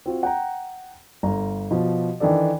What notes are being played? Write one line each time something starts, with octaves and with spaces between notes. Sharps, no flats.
C4 F4 F#4
F#5 G5 A#5
G1 A#5
B2 F3
D#3 E3 D4 A4 D5